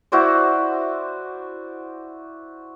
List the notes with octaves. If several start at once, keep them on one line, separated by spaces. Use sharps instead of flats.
E4 F#4 C5 D5